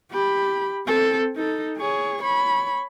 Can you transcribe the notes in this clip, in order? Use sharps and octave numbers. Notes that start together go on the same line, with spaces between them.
G4 B5
C4 A4
D#4 A4
G#4 C#5
C#5 B5